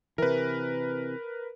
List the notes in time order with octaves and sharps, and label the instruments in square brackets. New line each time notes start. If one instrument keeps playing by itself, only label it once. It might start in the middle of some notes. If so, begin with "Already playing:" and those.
[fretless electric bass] C3 E3 [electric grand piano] A#4 B4